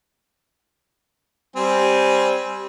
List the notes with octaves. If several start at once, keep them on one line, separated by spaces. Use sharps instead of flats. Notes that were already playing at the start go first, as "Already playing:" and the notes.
G3 C4 G#5